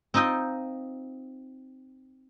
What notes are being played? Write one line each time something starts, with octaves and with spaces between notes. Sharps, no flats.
C4 D#4 F4 D#5 G5